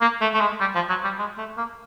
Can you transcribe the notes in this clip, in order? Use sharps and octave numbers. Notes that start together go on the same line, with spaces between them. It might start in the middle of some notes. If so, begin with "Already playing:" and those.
A#3
A3
A3
G#3
G3
F3
F#3
G3
G#3
A3
A#3